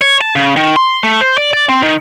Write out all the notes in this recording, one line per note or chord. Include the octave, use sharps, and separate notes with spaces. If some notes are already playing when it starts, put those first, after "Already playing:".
C#5
A5
C#3
D#3
C6
A3
C5
D5
D5
C4
D#3